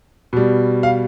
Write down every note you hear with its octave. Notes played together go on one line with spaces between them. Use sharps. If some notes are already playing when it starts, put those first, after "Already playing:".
B2 G3
F5